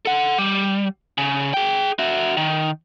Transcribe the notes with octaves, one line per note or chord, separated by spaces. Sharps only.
A4 F#5
G3
C#3
G#4 G5
F#4 E5
D#3